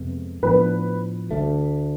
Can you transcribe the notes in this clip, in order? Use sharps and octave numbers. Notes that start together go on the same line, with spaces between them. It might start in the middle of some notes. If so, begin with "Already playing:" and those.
Already playing: F2 C3 G#3 B3
A2 F3 B3 D4 B4
D2 D3 A3